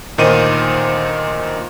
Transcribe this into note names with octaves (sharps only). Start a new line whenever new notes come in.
D2 A#2 D#3 D#4 C5 D#7